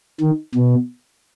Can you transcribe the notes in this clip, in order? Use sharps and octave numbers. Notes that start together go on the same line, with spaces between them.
D#3
B2